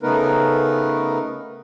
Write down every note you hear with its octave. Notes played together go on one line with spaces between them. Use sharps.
C#3 A3 B3 D#4 A#4 B4